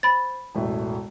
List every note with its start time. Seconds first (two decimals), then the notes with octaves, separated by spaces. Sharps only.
0.03 C5 B5 A6
0.55 E1 A1 A3